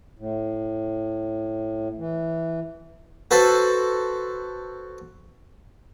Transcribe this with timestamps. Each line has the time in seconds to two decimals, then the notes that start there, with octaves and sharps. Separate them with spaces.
0.19 A2
1.98 E3
3.31 F#4 A4 B4 C5